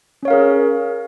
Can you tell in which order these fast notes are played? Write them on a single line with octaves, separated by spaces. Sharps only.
C#4 C#5 F5 A#4 G#4